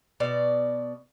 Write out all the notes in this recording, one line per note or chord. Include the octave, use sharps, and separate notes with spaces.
B2 D5